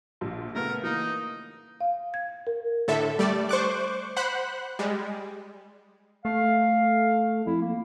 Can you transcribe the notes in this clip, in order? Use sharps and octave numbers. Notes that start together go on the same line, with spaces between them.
A#1 A#2 F3
C#3 A3 B3 A#4
E3 A#3 D#4
F5
G#6
A#4
A2 D3 A4 E5
G3 A3 D5
C5 C#6 D6 F#6
C5 F#5 B5 F#6
G3 G#3
A3 F5
F2 E4
A#3